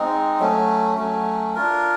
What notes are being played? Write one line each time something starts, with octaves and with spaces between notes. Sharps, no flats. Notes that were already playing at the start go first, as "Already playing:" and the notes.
Already playing: G#3 C4 D#4
F#3 A3 C#4
F#3 A3 C#4
D4 F4 A#4